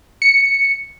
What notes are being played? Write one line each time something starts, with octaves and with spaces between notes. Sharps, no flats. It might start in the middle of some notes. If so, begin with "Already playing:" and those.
C#7